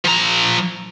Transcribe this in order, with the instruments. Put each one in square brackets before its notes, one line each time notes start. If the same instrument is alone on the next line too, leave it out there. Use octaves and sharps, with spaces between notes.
[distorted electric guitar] F3 A#5